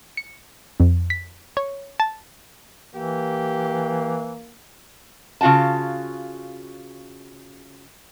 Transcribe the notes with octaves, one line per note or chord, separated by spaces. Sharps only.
C#7
F2
B6
C#5
A5
E3 A#3 G4
C#3 F4 F#4 G5 A5